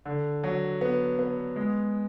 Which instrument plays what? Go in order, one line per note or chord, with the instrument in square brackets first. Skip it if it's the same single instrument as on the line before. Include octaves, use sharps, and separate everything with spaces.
[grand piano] D3
F#3
B3
B3
G#3